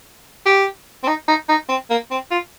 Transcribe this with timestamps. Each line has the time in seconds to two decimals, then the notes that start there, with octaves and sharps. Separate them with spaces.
0.46 G4
1.03 C4
1.07 D#4
1.28 D#4
1.49 D#4
1.69 C4
1.90 A#3
2.11 C4
2.31 F4